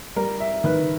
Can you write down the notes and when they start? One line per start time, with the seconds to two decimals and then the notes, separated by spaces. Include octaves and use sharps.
0.16 G3 A#4
0.40 E5
0.64 D#3 B4